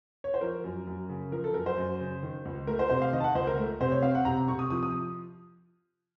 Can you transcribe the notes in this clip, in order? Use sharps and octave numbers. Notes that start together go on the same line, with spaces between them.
C#5
C5
F3 A#4
F#2
F#2
C#3
F3 A#4
A4
F#2 A#4
C5
F#2
C#3
D#3
C#2
A3 A#4
C5
C3 C5
F5
D#3 D#5
A5
F#5
C#2 C5
A#4
A3
C3 C5
C#5
C4 F5
F#5
C3 A#5
C3 C#6
D#6
F3 D#6
D#6